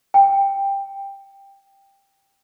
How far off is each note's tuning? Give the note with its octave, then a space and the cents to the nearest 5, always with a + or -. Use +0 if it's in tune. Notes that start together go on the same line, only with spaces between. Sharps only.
G5 +10